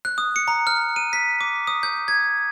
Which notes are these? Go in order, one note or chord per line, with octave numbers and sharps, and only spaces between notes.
F#6
D#6
C#7
A#5
F6
D#7
B6
D6
D#6
G6
G#6